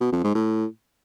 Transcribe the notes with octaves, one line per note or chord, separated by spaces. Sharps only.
B2
F2
G#2
A2